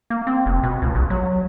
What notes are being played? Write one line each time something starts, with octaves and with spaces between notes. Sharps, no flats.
A#3
C4
F1
B2
C#2
A#1
F#3